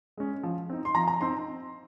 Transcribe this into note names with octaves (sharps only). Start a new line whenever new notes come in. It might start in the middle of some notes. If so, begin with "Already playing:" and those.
G#3 C#4
F3
C4 D#4
C6
F3 A#5
A#5
C4 D#4 C6